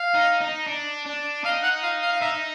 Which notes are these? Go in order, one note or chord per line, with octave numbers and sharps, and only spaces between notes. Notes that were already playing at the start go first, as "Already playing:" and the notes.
Already playing: F5
D#4
D#4
D4
D4
D#4 F5
F#5
F5
F5
F5
D#4 E5